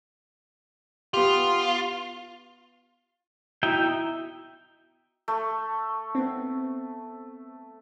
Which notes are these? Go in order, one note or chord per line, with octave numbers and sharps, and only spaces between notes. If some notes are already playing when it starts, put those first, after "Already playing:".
B3 F4 G4
B3 D#4 E4 F#4 E5 G5
A3
B3 C4